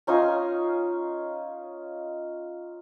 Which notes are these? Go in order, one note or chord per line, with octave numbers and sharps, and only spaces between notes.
C#4 D#4 F4 G#5